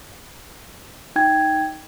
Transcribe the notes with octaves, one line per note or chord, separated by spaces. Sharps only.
D#4 G5 G#6